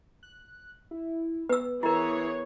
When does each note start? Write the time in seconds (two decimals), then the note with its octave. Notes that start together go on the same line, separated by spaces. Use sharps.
0.23 F#6
0.91 E4
1.49 B3 B4 E6
1.83 E3 E4 G#4 A#4 C#5